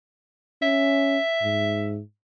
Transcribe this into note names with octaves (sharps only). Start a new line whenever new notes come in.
C#4 E5
G#2